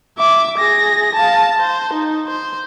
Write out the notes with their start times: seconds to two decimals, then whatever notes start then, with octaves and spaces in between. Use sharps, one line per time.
0.19 E5 D6
0.58 G#4 A#6
1.15 F5 A5
1.59 C5
1.93 D#4
2.28 C5